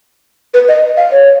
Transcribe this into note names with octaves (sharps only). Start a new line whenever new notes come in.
B4
D#5
F5
C#5